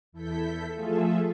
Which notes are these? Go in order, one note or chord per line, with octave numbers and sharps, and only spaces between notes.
E2 E4 A4 G6 B6
F3 A3 F4 G#4 A4 E5